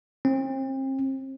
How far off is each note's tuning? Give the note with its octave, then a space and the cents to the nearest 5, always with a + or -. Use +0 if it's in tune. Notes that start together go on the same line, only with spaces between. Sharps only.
C4 +35